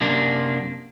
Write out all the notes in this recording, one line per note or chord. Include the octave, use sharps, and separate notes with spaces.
F#2 C3 A#3 D4